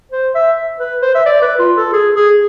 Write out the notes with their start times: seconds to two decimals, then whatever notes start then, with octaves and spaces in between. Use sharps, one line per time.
0.11 C5
0.35 E5
0.80 B4
1.02 C5
1.15 E5
1.26 D5
1.42 B4
1.59 F4
1.77 A4
1.93 G#4
2.15 G#4